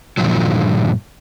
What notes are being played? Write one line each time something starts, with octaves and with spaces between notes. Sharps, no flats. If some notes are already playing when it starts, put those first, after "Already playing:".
G2 A#2 D3 D#3 F3 F#3